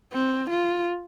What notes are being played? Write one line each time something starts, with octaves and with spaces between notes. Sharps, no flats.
C4
F4